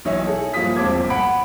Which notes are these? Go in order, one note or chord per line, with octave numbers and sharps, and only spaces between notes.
B1 E3 D#4 C#5 E5
G#4 A4
G2 F3 A#3 F4 D#6 B6
E1 F3 C4 A5 D6 G#6
G1
F#5 B5 D7